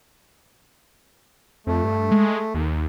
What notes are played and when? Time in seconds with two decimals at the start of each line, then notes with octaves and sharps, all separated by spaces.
1.67 F2 A3
1.84 G2
2.11 G#3
2.54 D#2